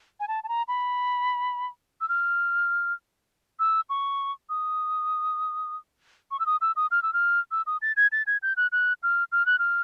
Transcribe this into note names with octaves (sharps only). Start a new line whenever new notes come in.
G#5
A5
A5
A#5
B5
E6
F6
E6
C#6
D#6
C#6
E6
D#6
E6
D#6
F6
E6
F6
E6
D#6
A6
G#6
A6
G#6
G6
F#6
F#6
F6
F6
F#6
F6